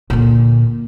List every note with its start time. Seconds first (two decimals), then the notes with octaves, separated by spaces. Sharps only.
0.10 A#2 D3